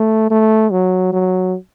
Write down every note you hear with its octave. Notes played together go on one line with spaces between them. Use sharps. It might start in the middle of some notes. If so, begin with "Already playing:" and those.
Already playing: A3
A3
F#3
F#3